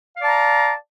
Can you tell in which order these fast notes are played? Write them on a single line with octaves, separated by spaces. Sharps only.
F5 D5 A5 A#5